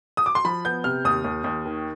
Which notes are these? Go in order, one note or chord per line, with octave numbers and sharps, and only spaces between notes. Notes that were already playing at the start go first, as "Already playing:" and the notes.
D#6
D6
C6
F3 B5
B3 G6
C3 F6
D#2 D#6
D#2
D#2
D#3